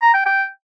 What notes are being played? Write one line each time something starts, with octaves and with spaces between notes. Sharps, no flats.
A#5
G5
G5